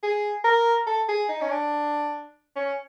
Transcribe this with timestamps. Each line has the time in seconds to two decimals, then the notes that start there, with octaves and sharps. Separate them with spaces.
0.03 G#4
0.44 A#4
0.87 A4
1.09 G#4
1.29 D#4
1.41 C#4
1.50 D4
2.56 C#4